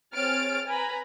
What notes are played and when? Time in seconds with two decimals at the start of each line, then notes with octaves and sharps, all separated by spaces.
0.14 C4 G#4 C#5 F6 A6 D7
0.67 B4 G#5 A#5 B5